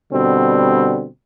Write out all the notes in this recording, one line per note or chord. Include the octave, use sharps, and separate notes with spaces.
B2 D3 G3 C4